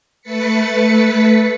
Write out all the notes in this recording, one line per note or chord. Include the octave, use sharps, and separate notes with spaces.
A3 B4 A6 B6 C#7